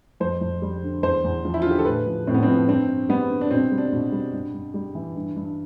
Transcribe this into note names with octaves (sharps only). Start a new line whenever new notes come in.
F2 C5
F2
G3
D3
E2 C5
E2
F3
E4
F4
D3
G4
A4
A2 B4
F3
A2 C4
B3
C4
F3
G2 C4
G2
G3 B3
D3
D4
B2 C4
G3
D4
B2
G3
G2
G2
G3
E3
G2
G2